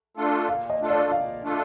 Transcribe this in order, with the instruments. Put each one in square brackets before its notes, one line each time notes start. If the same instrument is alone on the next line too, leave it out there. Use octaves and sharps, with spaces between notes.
[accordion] A3 D4 F4 A4
[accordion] A#2 [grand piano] F5
[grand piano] D#5
[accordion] A3 D4 F4 A4
[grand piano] D5
[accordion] A#2 [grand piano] F5
[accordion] A3 D4 F4 A4